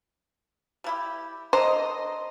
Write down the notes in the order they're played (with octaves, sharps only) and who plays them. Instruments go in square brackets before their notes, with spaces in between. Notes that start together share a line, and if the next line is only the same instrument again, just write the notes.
[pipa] G3 E4 G4
[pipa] D3 A#5 [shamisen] C5 [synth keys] D#5